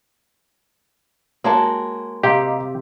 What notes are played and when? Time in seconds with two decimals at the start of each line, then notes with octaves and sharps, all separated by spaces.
1.44 G#3 A#3 F#4 C#5 A5
2.23 C3 G4 D#5 F5 A#5